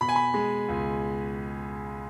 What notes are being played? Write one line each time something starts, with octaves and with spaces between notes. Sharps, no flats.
B2 B5
G#5
B5
G#3
C#2